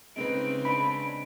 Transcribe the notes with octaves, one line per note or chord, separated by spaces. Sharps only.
C#3 G#3 C4 D#4 B4 D7
G#3 D4 B5